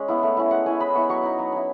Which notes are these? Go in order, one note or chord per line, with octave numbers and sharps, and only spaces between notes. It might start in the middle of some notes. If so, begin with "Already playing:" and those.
Already playing: G#3 C#4
B3 E4
A3
C#4 E4
G#3 F#5
C#4 E4 G#5
G#3 B5
B3 E4 C#6
F#3 C#6
B3 D#4
F#3
C#4 E4